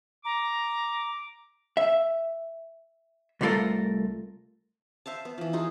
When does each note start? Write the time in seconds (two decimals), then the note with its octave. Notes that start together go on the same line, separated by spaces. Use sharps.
0.25 A#5 D6
1.77 E5
3.41 C2 G3 A3 F4 A4 A#4
5.06 C5 E5 F5 A5
5.25 B3
5.38 E3 F3
5.53 D#4 F4 F#4 G#4